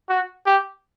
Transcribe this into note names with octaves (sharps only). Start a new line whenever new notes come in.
F#4
G4